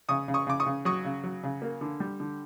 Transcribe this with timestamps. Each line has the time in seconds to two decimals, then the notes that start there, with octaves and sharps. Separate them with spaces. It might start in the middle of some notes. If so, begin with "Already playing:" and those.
0.09 C#3 C#6 D#6
0.28 C#3
0.34 C#6 D#6
0.47 C#3 D6
0.60 C#6 D#6
0.66 C#3
0.85 F#3 C#6 D#6
1.04 C#3
1.24 F#3
1.43 C#3
1.62 A#3
1.81 D3
2.00 G3
2.20 D3